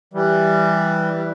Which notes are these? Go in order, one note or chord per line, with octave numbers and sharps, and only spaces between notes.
E3 G3
G3